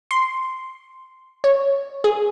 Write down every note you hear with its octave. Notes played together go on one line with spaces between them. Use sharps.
C6
C#5
G#4